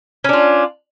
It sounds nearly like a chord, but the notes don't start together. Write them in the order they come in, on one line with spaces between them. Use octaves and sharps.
C#4 D4 F4